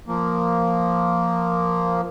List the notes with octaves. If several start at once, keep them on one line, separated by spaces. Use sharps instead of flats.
F3 A#3